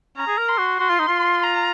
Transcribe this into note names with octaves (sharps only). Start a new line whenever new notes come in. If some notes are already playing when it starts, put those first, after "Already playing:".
C#4 A#5
G#4
A#4
C6
F#4
F#4 C6
F4
D#4
F4
A#5